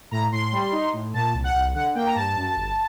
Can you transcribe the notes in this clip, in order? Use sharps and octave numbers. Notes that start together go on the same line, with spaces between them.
A2 A#5
A2 C6
G3
D#4
A2
A#2 A5
C2
F#5
C2
D3 F#5
A#3 G5
A#5
G2 A5
F#2
G1